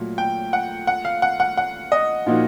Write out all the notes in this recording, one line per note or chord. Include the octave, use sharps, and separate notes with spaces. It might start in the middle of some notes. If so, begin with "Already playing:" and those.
Already playing: A#2 F#3 A3
G5
F#5
F#5
F5
F#5
F#5
F#5
D#5
A#2 F3 A#3 D#4 F#4